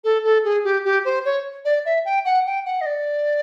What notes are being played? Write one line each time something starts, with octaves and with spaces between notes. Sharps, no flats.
A4
A4
G#4
G4
G4
C5
C#5
D5
E5
G5
F#5
G5
F#5
D#5
D5